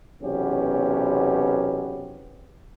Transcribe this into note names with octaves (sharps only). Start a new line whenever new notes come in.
B1 E2 C3 B3 C#4 G4